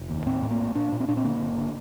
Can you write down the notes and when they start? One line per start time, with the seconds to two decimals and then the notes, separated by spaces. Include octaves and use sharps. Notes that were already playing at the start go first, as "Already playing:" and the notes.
Already playing: F1
0.09 D#2
0.26 A2 C4
0.42 A2
0.50 A#3
0.59 A#1
0.75 A#2 D4
0.92 A#2
1.00 C4
1.08 A#2 D4
1.17 C4
1.24 D3 A#3
1.41 G1
1.58 D3